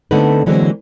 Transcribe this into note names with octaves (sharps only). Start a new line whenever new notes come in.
D3 A3 B3 C4 D#4 B4
D3 E3 F#3 G#3 A#3 C4